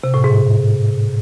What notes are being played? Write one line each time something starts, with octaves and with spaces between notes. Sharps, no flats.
C3
A2
G#2